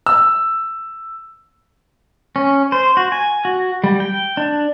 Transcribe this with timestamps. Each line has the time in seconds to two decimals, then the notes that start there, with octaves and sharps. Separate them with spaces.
0.06 E6
2.36 C#4
2.72 C5
2.97 F#4
3.12 G#5
3.45 F#4
3.84 G3
4.00 G5
4.37 D4